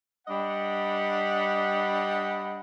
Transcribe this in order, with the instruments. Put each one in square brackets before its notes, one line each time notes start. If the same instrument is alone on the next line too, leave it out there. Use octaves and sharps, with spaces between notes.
[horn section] G3 D4 D#5 F#5 B5